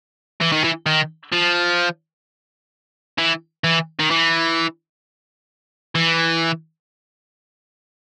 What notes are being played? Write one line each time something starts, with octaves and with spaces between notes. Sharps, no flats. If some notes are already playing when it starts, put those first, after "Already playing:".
E3
D#3
E3
D#3
F3
E3
E3
D#3
E3
E3